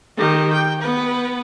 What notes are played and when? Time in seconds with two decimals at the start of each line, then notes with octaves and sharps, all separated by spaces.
0.17 D#3 G4
0.53 G5
0.82 B3 B4